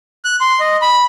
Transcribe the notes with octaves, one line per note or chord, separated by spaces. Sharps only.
F#6
C6
D#5
B5